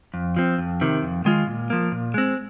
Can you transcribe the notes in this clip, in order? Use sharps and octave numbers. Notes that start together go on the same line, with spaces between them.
F2
F3 C4
F2
C3 D#3
F2
D#3 G#3 F4
A#2
F3 A#3
A#2
G#3 C4